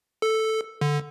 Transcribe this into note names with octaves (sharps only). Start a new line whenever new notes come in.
A4
D3